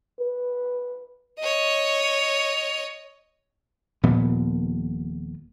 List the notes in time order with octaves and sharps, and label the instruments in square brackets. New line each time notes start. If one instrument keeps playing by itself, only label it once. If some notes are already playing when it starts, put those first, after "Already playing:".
[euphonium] B4
[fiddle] C#5 D#5
[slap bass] D#1 A#2 F3 B3